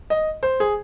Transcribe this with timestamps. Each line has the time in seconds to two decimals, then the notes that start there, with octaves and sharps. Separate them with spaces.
0.10 D#5
0.43 C5
0.60 G#4